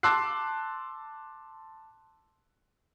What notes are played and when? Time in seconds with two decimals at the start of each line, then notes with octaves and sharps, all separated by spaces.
0.03 A5 C6 D6 E6 F#6 C7